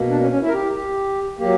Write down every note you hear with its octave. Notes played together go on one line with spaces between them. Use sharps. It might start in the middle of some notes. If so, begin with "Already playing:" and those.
Already playing: B2 A#3
D4
C#4
C#4
E4
A#4
G4
G4
F#3 A#3 G4